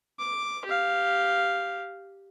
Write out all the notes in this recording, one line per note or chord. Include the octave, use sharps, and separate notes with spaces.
D6
G4 F5